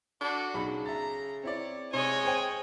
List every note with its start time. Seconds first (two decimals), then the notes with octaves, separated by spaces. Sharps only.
0.21 D4 F#4 A4
0.54 B1 C#3 B5
0.86 E5 A#5 A6
1.43 C4 E4 C#5 D5
1.93 C3 G#3 C#5 D#5 G#5
2.25 C5 G5